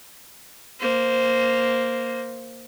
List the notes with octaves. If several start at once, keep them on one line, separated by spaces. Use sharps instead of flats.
A#3 C5